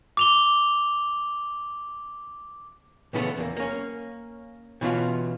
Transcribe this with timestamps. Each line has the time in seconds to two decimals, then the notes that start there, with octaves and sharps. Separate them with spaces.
0.17 D6 F7 G7
3.13 A#2 C#3 E3 A3 B3 A4
3.37 E2 A#3
3.57 A#3 C#4
4.81 B2 E3 C#4 F4